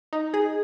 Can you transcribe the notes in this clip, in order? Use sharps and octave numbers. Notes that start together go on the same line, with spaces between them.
D#4
G#4